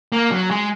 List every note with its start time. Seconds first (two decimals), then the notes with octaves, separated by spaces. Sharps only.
0.12 A#3
0.32 F#3
0.51 G#3